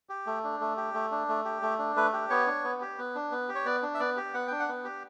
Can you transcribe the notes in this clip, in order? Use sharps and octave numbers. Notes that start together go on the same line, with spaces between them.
G4
A3
D4
A3
G4
A3
D4
A3
G4
A3
D4
A3 B4
G4
B3 C#5
D4
B3
G4
B3
D4
B3
G4
C#5
B3 D5
D4
E5
B3 D5
G4
B3 F#5
D4 G5
F#5
B3
G4